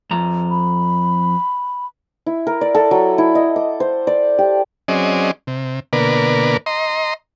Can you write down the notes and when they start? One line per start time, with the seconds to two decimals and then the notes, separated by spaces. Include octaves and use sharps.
0.11 F2 A#5
0.50 B5
2.26 E4
2.47 A#4
2.61 D5
2.75 A4
2.91 F#3
3.18 E4
3.35 D#5
3.56 D6
3.80 C5
4.07 D5
4.39 G4
4.88 F#3 C4 C#4 G#4 D5 D#5
5.47 C3
5.93 B2 D3 A#3 A#4 B4 D5
6.66 D#5 A#5 C6